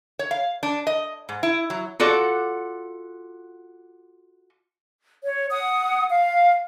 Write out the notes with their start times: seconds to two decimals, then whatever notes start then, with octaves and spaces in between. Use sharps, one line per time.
0.19 C#5
0.31 F5
0.63 D4
0.87 D#5
1.29 G#2
1.43 E4
1.70 F#3
2.00 F4 F#4 A4 D5 F#5
5.24 C#5
5.51 F#5 D#6
6.09 F5